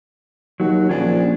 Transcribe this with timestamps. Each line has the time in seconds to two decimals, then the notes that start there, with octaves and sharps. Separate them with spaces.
0.60 D#2 F#3 F#4
0.89 A#1 C#4 D4 G#4